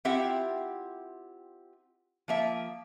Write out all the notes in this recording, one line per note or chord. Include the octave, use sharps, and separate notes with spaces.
C4 E4 F4 G4 E5 F#5
F3 A#3 E5